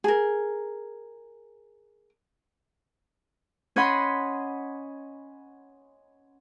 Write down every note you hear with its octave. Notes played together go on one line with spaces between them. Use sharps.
G#4 A#4
C#4 C#5 D#5 F#5 B5 C6